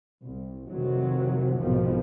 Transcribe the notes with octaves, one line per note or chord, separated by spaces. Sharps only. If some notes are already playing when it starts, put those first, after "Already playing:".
C2
F1 C3 D#3 F#3
B1 F2 G#2 B2 D#3 F3